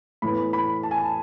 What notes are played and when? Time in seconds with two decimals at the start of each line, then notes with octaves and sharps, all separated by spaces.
0.22 A2 E3 B3 B5
0.53 B5
0.83 A5
0.91 G#5
0.98 A5